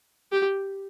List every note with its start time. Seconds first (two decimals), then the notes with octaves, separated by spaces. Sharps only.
0.32 G4